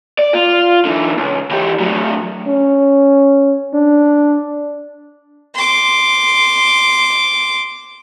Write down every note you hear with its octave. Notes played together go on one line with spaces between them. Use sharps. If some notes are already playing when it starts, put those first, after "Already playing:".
D5
F4
D3 E3
C#2
E3 G4
A2 F#3
C#4
D4
C6 D6